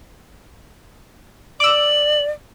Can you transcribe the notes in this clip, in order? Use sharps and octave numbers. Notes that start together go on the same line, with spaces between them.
D5 D6 E6 F#7